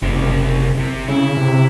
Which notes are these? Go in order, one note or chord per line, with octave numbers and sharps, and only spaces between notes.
F#1 C3 E4
C3
C#3 E4
C3